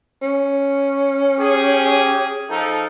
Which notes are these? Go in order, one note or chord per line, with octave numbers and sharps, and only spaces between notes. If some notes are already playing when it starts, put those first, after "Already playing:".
C#4
G4 G#4
F3 D#4 A4